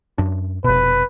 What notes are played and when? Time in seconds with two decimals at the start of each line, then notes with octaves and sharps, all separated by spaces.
0.18 F#2 D4
0.64 F1 B2 B4